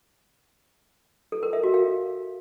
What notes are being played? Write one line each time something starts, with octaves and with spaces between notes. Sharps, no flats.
A4
A#4
E5
F#4
F5